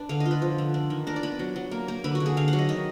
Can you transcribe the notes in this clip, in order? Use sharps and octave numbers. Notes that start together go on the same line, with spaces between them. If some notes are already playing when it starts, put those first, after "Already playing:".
Already playing: D4 B4
D3 F5
D#5
F4
B4
F3
D3
D4
D#3
D4 A#4
D5
B3 B4
F#3
F#3
A#3
A#3
D3 B4
F#4
D3
G#4
D3 F5
F#5
F#3
D#5
D#3 D#5